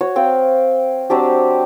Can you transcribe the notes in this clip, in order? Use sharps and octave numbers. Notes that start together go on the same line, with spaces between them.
F#4 C#5
C4 F5 G5
F#3 C4 D4 G4